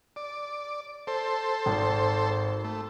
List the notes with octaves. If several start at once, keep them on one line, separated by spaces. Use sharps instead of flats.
D5
A4 C5
G#1
A3